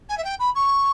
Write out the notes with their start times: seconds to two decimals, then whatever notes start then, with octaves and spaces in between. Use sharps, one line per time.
0.09 G#5
0.17 E5
0.24 G5
0.39 B5
0.55 C#6